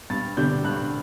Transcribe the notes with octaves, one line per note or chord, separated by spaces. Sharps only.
G2 A6
D3 G3 D4 G6
G2 F#6